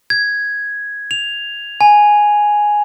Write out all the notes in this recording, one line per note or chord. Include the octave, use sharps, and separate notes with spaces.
G#6
F7
G#5